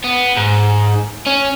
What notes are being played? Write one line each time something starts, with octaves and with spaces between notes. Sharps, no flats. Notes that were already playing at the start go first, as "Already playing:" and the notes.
B3
G#2
C#4